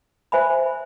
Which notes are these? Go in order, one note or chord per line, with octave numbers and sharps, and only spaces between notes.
C5 E5 G#5 B5